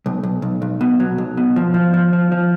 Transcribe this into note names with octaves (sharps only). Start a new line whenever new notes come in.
B1
B1
B1
B1
B2
F#3
B1
B2
F3
F3
F3
F3
F3